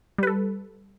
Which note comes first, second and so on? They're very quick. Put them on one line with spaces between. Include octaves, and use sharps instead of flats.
G3 B4 A4